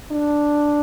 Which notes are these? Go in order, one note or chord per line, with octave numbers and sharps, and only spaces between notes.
D4